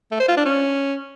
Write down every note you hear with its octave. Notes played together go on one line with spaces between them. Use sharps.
A3
C5
F4
D4
C#4